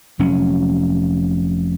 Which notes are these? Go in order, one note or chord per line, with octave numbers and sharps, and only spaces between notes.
F1 F#3 C#4